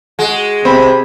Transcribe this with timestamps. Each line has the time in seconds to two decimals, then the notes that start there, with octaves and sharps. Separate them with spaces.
0.19 G#3 F#4
0.65 C3 C4 B5